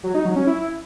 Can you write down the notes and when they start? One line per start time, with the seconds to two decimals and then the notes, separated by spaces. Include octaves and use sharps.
0.04 F#3
0.14 D#4
0.25 F#3
0.36 C#4
0.47 E4